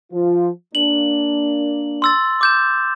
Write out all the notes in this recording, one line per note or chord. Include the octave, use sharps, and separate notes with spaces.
F3 F4
A#3 D4 F#7
C6 E6 A6
D6 G6 E7